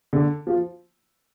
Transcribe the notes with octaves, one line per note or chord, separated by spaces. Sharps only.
D3
F3